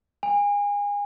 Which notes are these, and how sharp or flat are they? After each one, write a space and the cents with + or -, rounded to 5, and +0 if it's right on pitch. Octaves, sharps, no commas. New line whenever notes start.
G#5 -30